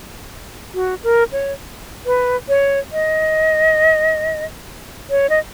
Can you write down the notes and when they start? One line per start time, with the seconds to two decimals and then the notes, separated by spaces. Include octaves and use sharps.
0.74 F#4
1.03 A#4
1.32 C#5
2.06 B4
2.49 C#5
2.92 D#5
5.10 C#5
5.30 D#5